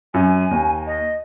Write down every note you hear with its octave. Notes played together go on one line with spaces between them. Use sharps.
F#2 G#5
D#2
D#5